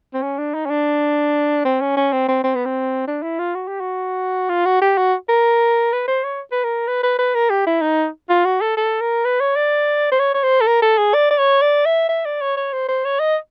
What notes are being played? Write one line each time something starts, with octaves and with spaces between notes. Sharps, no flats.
C4
C#4
D4
D#4
C#4
D4
C4
C#4
C#4
C4
C4
C4
B3
C4
D4
E4
F4
F#4
G4
F#4
F4
F#4
G4
F#4
A#4
B4
C5
C#5
B4
A#4
B4
B4
B4
A#4
G4
E4
D#4
F4
F#4
A4
A4
A#4
B4
C#5
D5
C5
C#5
C#5
C5
A4
A#4
A4
G#4
D5
D5
C#5
D5
E5
E5
D5
C#5
C#5
C5
C5
C#5
D#5